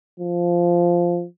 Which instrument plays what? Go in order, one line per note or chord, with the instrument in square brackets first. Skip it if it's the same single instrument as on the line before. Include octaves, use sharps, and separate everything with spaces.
[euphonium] F3